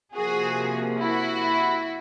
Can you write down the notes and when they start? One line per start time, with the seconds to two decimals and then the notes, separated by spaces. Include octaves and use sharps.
0.15 C3 F3 A#3 F#4 G#4
1.00 E4 F#4